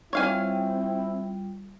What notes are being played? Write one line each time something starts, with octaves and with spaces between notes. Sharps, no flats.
G3 C4 E4 F4 C#5 F5 G#5